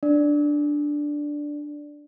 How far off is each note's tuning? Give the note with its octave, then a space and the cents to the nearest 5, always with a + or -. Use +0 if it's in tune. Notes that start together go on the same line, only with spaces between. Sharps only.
D4 +0 D5 +0